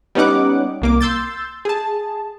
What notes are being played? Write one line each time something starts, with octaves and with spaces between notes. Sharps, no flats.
G3 B3 C#4 D#4 F#5 D6
C2 A#3 D6
C6 E6 G6 A6
G#4 A5